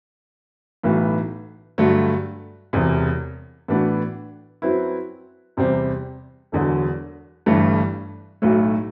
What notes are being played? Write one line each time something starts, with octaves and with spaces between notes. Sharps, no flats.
B1 A2 E3 B3
G2 D3 F#3 A3
E1 E2 C3
A2 E3 B3 D4 F#4
F#2 F#3 C4 E4 B4
E2 C3 G3 C4
E1 E2 D3 F#3
G1 G2 E3 A3
B1 A2 F#3 A3